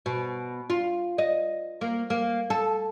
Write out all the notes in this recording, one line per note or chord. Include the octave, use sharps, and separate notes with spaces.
B2
F4
D#5
A#3
A#3
A4